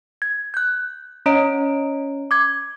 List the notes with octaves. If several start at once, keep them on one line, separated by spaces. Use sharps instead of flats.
G#6
F#6 G6
C#4 C#5 D#5 A#5 D7
D6 G#6